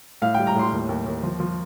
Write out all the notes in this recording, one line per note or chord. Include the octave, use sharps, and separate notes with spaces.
A2 F5
G3 G5
A#5
A2 C6
D#2
D#2
D#2
F3
F3